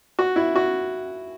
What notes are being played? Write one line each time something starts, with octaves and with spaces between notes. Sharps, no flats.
F#4
E4
F#4